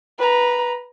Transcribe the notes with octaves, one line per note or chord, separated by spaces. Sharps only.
B4 A#5